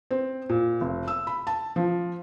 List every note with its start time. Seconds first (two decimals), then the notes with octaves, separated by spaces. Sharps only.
0.11 C4
0.49 A#2
0.81 F1
1.08 E6
1.27 B5
1.47 A5
1.76 F3